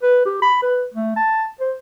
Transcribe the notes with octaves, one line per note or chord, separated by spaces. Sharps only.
B4
G4
B5
B4
A3
A5
C5